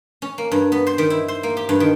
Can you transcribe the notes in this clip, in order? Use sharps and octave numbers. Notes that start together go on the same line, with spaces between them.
C#4
A#3
G2
B3
C5
D#3
E4
C5
A#3
G4
G2
D#3